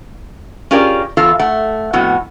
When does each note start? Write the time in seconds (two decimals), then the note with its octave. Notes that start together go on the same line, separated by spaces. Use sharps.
0.71 C#4 F4 G4 G#4 A#4 D5
1.17 E2 F4 A4 F5
1.40 A3 F#5
1.93 F2 A2 B3 F#4